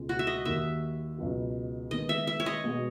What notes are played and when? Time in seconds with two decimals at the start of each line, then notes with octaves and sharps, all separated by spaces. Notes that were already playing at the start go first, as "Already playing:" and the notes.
Already playing: C#2 B2 G#3
0.09 F#4
0.19 E5
0.27 D#5
0.45 D#2 D#3 A#3 E5
1.18 C#2 B2 F#3
1.91 D#3 G#3 B3 D#5
2.09 E5
2.27 E5
2.40 C#5
2.46 D#5
2.64 B2 G#3 B3 F#4